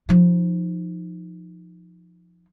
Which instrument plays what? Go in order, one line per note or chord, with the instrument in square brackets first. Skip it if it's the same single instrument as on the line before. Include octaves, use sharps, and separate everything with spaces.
[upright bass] F3 D#4